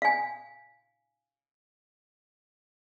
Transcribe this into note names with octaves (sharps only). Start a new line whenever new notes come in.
F5 G#5